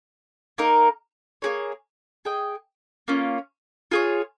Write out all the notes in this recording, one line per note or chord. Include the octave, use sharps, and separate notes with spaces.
A#3 D#4 A#4
A#3 C#4 G#4 C#5
G#4 D#5 G5
A#3 C#4 F4
F4 G#4 C#5